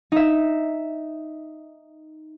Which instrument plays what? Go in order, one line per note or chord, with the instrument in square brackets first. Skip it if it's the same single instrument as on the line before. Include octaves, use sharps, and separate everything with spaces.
[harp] D#4 E5